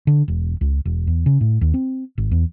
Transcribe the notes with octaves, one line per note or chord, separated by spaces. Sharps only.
D3
E1
C#2
E1
E2
C#3
A2
D#2
C4
G#1
E2